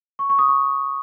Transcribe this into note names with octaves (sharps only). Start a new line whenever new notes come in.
C#6
C#6
D#6
C#6